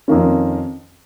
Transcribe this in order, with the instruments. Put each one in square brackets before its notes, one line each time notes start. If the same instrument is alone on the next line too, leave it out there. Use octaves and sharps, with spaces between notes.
[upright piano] F2 D#3 A#3 C#4